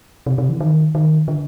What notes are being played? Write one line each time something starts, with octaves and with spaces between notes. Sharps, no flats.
C3
C3
E3
D#3
D#3
D3